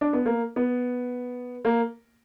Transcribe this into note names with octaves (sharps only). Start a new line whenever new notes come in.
D4
B3
A#3
B3
A#3